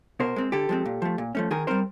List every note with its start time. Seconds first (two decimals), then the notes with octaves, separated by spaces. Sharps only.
0.20 B2 A#4 C5
0.36 G#3 C4
0.52 D3 G4 A4
0.69 F3 G#3 C4
0.85 A#2
1.02 F3 A3
1.18 A#2
1.35 F3 A3 C#4
1.51 D#3 G#4 A#4
1.67 G3 C4 A#4 C5